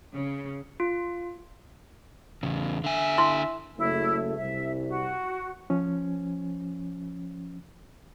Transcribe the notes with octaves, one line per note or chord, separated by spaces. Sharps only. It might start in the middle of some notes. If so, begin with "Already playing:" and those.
C#3
F4
E2 C#3
D3 E5 G#5
E4 C6
F#1 C#3 A3 E4
C2 E5
F#4
F3 C#4